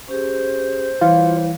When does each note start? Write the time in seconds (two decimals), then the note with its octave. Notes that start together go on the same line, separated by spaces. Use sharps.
0.08 C#4 G4 G#4 C5
1.01 E3 G3 F4 C#5 F5